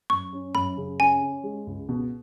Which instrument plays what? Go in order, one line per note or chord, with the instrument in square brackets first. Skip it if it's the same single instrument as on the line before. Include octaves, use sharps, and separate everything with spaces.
[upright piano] F#2 [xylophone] C#6
[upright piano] C#4
[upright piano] F#2 [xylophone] B5
[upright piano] C#3
[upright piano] C#4 [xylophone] G#5
[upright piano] C#4
G#3
C#2
B2